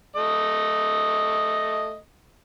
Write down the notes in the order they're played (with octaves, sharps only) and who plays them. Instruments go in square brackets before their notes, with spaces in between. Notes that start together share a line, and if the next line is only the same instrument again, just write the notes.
[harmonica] A3 D#5